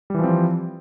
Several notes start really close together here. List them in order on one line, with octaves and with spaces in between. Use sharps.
G3 E3 F3 C4